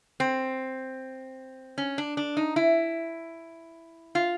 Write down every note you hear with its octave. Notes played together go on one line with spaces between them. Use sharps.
C4
C#4
D4
D4
D#4
E4
F4